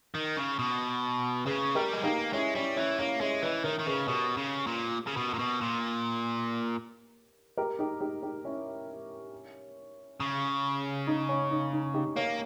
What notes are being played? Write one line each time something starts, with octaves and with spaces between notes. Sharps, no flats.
D#3
C#3
B2
C#3 G#4 B4
G3 G4 A#4
G#3
A#3 D#4 G4
G#3 C#4 E4
G3 C#4 E4
E3 C#4 E4
A#3 C#4 E4
G#3 C#4 E4
E3 B4 D#5
D#3 A#4 C#5
D#3
C#3 G#4 B4
B2 G4 A#4
C#3
A#2
C#3
B2
A#2
B2
A#2
G4 A#4
D#4 G4
D#4 G4
D#4 G4
C#4 E4
C#3
D#4
C#4
D#4
D#4
D#4 G4
A#3 A#4 C#5